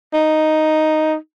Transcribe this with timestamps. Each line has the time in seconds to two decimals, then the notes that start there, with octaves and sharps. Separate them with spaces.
0.13 D#4